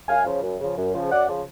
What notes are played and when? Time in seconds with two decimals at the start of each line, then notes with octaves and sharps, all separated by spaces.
0.09 F#2 F5 G#5
0.26 C#3 F3
0.43 F#2
0.60 C#3 F3
0.77 F#2
0.94 C#3 F3
1.11 F#2 D5 F#5
1.28 C#3 F3